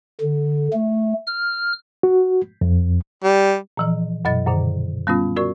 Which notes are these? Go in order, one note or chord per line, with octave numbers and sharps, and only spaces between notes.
D3
A3
F6
F#4
F2
G3
A#2 E3 F3
F#2 B2 F#3 D#5 A6
F#2 A#2 D3 D#3
G3 B3 C#4 F4
F#4 A#4 D5 C#6